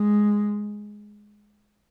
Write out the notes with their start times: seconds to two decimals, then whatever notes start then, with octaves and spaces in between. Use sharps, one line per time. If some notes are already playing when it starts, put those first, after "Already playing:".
Already playing: G#3